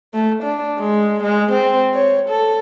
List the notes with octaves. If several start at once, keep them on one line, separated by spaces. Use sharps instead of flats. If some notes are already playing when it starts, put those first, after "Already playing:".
A3
D4
G#3
G#3
C4
C#5
A4